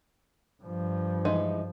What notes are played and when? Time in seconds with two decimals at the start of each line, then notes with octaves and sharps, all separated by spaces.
0.63 G2 F3
1.25 E3 G#3 D#4